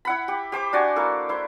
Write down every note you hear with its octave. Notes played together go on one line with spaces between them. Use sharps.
E4 F#5 B5
G4
G4 C5 D6
D4 F#4 D5 G#5
A#3 E4 A4
E4 C5